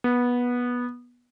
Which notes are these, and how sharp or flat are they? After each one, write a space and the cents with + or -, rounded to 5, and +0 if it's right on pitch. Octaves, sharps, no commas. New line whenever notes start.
B3 -15